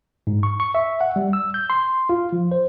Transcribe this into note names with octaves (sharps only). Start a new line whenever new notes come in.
G#2
C#6
C#6
E5
F#5
G3
E6
G6
C6
F4
F3
C5